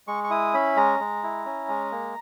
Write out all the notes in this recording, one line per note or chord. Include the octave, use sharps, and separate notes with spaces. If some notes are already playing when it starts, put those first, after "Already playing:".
G#3 C#6
C#6
E4 D#6
C#4 B5
G#3 A#5
G#3
E4
C#4
G#3
A#3